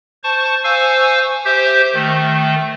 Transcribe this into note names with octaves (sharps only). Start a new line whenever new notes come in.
C5 A5 C#6
C5 F5 G#5 C#6 E6
G4 C5 E5 G6
D#3 A3